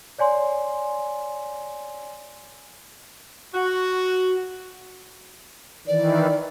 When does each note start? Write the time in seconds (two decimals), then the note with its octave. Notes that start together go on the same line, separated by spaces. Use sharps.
0.18 C#5 D5 G#5 C6
3.54 F#4
5.87 D#3 E3 D5